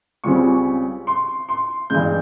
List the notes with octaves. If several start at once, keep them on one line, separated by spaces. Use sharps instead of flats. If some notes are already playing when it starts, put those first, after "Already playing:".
C#2 C#3 G3 C4 C#6
C6
C6
G2 E3 G#3 G6